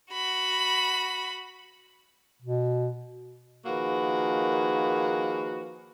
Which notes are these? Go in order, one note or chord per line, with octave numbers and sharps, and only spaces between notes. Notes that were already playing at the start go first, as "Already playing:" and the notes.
F#4 B5
B2
D#3 F3 A#3 F#4 G#4 B4